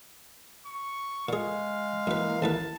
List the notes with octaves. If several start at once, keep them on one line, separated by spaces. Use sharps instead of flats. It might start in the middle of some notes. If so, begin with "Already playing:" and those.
C#6
A#2 G#3 G#4 F5
F#2 E3 A#3 B4
A1 D#2 B4 A5